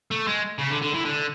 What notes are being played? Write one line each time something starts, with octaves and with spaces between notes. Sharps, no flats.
A3
G#3
C#3
D3
D3
E3
D3